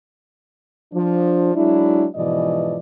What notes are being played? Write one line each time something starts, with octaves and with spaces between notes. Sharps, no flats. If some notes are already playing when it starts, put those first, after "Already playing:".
F3 D4
F#3 G#3 D4 E4
G#2 B2 E3 F3 D5 D#5